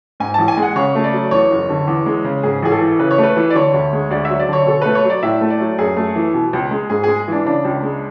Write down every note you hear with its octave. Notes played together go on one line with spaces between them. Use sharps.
G#2 G#5
A1 A5
G#5
G#3
F#5
C#3 C#5
A3
D5
F#3
E2 C#5
F#1
D3
E2
G#3
C#3
G#2 G#4
A1 G#4
A4
E3
C#3 B4
C#5
A3
B4
E3
D5
D3 C#5
D2
G#3
D2 D5
E5
F#3
D5
D3 C#5
B2 A4
A3 B4
C#5
F#3
D5
A2 E5
A3
D5
F#3
F#2 G#4
A3
E3
B2
C#2
G#3
G#2 G#4
G#3 G#4
E3 D4
C#3 D4
C#2
G#3